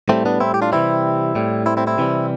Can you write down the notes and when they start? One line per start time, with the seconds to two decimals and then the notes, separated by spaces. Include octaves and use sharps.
0.09 A2 G3 A3 C4
0.25 B3 D4
0.40 C4 E4
0.54 G4
0.62 D4 F4
0.72 C3 E3 G3 C4 E4
1.35 A2 G3
1.66 C4 E4
1.77 C4 E4
1.87 C4 E4
1.98 C3 E3 G3